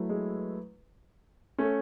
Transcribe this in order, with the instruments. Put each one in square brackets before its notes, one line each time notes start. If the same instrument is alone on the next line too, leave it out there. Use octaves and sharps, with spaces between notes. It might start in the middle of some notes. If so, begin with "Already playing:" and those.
Already playing: [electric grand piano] F#3 A3 E4 B4
[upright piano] G#3
A3 C#4